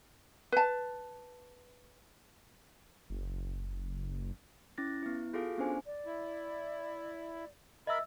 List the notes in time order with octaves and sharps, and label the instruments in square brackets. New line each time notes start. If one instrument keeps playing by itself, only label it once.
[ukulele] B4 A5
[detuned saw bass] F#1
[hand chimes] C#4 E4 A6 A#6
B3 E4
F4 F#4 G#4 A4 F5
B3 C#4 D4 C5 G#5
[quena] D5
[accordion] E4
[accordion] A#4 B5 [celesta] D#5 E5 E6